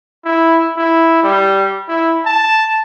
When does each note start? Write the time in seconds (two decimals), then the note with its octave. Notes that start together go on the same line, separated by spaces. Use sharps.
0.25 E4
0.77 E4
1.23 G3
1.88 E4
2.25 A5